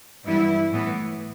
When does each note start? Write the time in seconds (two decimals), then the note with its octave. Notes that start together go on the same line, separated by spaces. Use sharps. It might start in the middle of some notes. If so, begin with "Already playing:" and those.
0.23 G2 E3 G3 B3 E4
0.71 A2 E3 B3